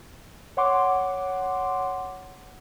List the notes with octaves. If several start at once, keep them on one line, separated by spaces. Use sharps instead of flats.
C#5 F#5 C6 D6